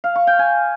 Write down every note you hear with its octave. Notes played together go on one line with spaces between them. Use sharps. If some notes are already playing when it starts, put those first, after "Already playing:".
F5
C#6
G5
G#5